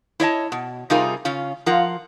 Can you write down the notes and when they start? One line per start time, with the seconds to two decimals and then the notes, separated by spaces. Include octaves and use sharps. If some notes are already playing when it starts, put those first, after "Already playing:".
0.20 E4 C#5 D#5 A5
0.52 B2
0.90 C3 G3 D#4 F4 G#4 A#4
1.25 C#3 C#4 F4
1.66 F3 F4 A#4 F#5